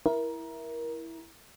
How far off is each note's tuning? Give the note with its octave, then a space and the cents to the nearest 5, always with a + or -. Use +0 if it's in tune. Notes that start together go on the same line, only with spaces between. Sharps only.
E4 +0 A#4 +20